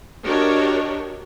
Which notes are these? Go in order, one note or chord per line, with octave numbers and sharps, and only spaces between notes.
D4 F#4 G4 A#4 C#5 D#5